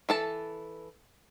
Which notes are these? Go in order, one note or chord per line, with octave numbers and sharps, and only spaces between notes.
E3 A4 A5